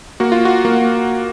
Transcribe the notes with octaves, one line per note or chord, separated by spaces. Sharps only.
A#3 F#4
F4
F#4
A#3